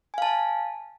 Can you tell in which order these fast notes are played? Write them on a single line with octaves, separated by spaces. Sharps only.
G#5 F5 A5